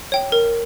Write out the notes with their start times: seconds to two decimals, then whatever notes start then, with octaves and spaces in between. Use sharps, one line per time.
0.12 C#5 G5
0.32 A#4